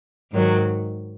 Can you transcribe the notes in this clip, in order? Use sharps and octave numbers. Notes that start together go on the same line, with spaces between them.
G#2 D#3 F#3